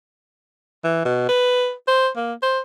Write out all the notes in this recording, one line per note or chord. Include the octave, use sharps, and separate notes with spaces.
E3
B2
B4
C5
A#3
C5